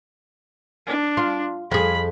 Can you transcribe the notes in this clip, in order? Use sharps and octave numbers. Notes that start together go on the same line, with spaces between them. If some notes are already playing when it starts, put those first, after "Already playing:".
D4
F4
F2 G#4 B5